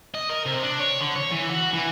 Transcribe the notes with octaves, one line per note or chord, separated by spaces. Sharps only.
D#5
A#4
C3
D4
C#5
D3
C#5
E3
F#4
E3